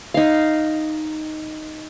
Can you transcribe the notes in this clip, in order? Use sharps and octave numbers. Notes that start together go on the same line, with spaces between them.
D#4 F5